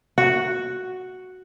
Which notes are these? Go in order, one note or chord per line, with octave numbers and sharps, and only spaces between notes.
F#4